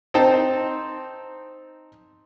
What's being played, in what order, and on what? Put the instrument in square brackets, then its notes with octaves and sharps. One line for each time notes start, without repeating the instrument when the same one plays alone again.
[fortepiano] C4 D#4 C5 G5 A5